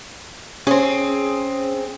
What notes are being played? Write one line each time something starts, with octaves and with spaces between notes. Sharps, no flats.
C4 C#4 G#4